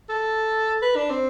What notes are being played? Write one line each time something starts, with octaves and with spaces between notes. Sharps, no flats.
A4
B4
D4
C4